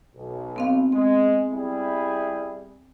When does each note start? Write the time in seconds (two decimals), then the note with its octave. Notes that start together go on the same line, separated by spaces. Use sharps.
0.15 B1
0.56 B3 C4 F5
0.92 G#3 C4
1.52 G3 E4 G#4